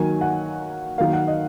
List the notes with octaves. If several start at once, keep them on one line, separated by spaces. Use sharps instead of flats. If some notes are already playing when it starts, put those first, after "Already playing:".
Already playing: D#3 F#3 A#3 G#5
F#5
D#3 F#3 A#3 F5
F#5
D#5